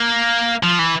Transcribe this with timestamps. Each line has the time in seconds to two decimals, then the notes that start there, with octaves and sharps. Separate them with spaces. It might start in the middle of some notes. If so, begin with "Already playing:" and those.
Already playing: A#3
0.63 F3
0.79 E3